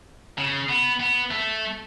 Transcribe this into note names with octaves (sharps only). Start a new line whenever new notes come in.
C#3
B3
B3
A3